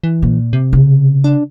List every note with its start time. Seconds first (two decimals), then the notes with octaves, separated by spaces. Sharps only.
0.04 E3
0.22 A#2
0.53 C3
0.73 C#3
1.24 D4